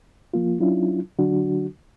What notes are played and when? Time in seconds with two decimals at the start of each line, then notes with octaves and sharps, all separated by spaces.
0.34 F3 A#3 F4
0.60 F#3 C#4 D4 E4 F4
1.19 D3 F#3 D4 F#4